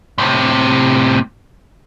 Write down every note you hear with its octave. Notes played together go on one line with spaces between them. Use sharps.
A2 C3